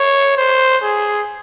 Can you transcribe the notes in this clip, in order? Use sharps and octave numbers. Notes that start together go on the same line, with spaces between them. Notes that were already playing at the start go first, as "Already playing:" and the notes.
Already playing: C#5
C5
G#4